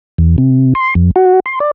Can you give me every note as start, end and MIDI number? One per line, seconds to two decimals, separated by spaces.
0.18 0.36 40
0.38 0.73 48
0.75 0.94 84
0.95 1.11 41
1.16 1.40 66
1.46 1.59 84
1.60 1.71 74